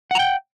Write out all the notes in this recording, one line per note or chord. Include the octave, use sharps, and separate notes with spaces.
F#5 G5 A#5